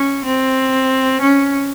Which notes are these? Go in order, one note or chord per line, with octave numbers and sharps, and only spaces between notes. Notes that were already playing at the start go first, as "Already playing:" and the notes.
Already playing: C#4
C4
C#4